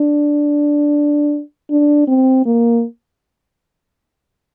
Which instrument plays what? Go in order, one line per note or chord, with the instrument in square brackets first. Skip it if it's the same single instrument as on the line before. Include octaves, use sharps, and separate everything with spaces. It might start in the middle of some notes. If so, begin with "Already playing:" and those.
Already playing: [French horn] D4
D4
C4
A#3